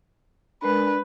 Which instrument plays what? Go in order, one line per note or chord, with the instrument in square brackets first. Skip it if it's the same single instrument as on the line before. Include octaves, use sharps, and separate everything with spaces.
[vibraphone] G#3 A#4 [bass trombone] D4 [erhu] B4